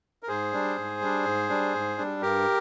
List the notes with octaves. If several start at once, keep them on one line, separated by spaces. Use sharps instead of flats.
A#4
G#2 G#4 C5
G3 D4
G#2
G3 D4
G#2
G3 D4
G#2
G3 D4
G2 G4 A#4